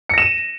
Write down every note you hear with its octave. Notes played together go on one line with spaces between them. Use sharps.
A#6 C#7 D#7 E7